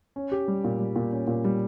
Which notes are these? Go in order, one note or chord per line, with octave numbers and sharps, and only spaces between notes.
C#4
G4
G3
A#2
G3
A#2
C#4
A#2
G3